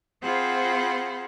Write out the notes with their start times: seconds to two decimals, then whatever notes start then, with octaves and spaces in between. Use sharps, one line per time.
0.22 C4 F4 G#4 C5 F#5 B5